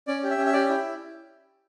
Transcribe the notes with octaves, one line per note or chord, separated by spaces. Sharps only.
C#4 D5
G4
E5
C#4
E5
G4 D5
E4